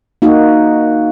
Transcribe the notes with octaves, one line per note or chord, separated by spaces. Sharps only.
A#3 D#4 F#4